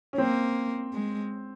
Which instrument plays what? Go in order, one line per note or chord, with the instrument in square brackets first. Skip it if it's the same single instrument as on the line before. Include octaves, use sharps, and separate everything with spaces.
[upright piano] C#4
[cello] A#3 [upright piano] C4
[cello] G#3